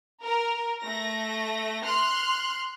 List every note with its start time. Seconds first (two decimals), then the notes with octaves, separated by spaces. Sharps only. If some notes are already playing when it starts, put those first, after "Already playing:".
0.22 A#4
0.83 A3 A#6
1.84 C6 F6 F#6